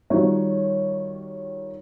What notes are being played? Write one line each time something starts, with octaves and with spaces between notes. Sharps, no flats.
D#3 G3 D#4 F4 F#4 C#5